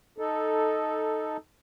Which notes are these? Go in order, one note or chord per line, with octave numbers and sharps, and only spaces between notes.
D#4 A4